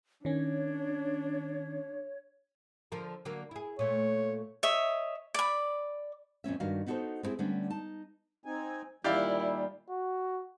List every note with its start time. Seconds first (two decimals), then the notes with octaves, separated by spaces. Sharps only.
0.25 D#3 C#4 D4 C#5
2.92 D3 F3 A#4
3.25 D3 F#3 A#3
3.51 E4 G#4
3.79 A#2 A3 C#5
4.63 C#5 D#5 E5
5.34 D5 B5
6.44 F2 A#2 C#4 E5
6.60 G2 D#3 F#4 G4 F5
6.87 B3 D#4 F#4 G#4 A4 C5
7.23 B3 C4 E4 G#4
7.39 D3 G3 A3 B3 C#4 D4
7.70 D#4 A5
8.45 C4 D#4 G#5
9.04 A#2 D#3 G3 E4 G4 D5 F5
9.90 F#4